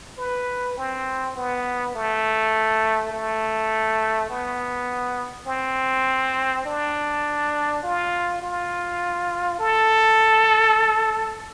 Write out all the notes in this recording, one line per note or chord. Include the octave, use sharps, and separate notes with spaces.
B4
C4
B3
A3
A3
B3
C4
D4
F4
F4
A4